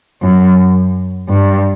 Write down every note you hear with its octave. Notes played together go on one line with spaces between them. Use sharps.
F#2
G2